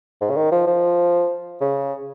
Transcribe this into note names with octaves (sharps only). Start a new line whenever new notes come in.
G#2
C#3
D#3
F3
F3
C#3